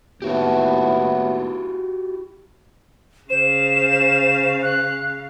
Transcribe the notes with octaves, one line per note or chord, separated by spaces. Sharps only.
D#2 A2 B3 E4 F#4 G4
C#3 C5 F5 E7
F#6